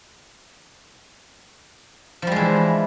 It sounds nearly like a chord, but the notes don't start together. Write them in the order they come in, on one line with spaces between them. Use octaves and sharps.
F3 G3 G#3 E3